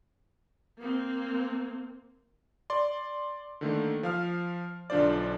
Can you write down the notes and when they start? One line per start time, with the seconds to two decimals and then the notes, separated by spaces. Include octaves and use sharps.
0.78 A#3 C4
2.70 D5 C6
3.61 D3 D#3 A3 A#3
4.03 F3 F5 F6
4.90 B1 D3 D4 F4 C5 D5